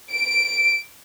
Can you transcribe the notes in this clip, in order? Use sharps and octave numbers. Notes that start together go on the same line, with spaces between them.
D7